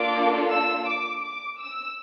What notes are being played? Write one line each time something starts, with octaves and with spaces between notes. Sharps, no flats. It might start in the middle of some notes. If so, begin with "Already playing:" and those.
Already playing: A#3 D4 F4 A4 D6
E6
D6
D6
E6